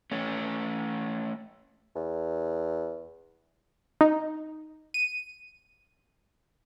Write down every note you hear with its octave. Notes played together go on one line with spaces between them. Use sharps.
A3 C#4
E2
D#4
D#7